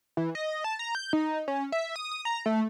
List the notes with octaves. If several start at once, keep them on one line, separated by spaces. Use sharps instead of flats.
E3
D#5
A5
A#5
G6
D#4
C#4
E5
D#6
D#6
A#5
A3